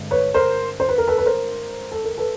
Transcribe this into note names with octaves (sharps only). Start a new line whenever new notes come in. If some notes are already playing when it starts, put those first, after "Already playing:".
Already playing: G2 D3 G#3 C4
B4 C#5
A#4 C5
C5
B4
A#4
A4 B4
B4
A#4 C5
A4
A#4
A4 B4